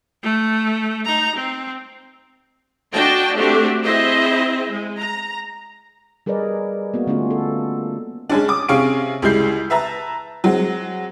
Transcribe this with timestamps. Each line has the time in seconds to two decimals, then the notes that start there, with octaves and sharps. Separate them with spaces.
0.23 A3
1.05 D#4 A#5
1.35 C4
2.93 D4 F#4 D#5 G5 A5
3.35 A3 C4 D4 F#4 G4
3.84 C4 E4 G#4 C5 D#5 E5
4.70 G#3
4.99 A#5
6.26 G3 G#4 A#4 B4 D5 D#5
6.94 A#3 B3 F#4
7.07 D3 A3 B3 C#4 F4
7.31 A4
8.30 G#3 C#4 D4
8.48 D6 D#6
8.68 C3 C#4 G#4 F5 C#6 D7
9.22 C#2 G3 G#3 E4 G6 C7
9.70 B4 E5 A5 A#5
10.44 F#3 G#3 C4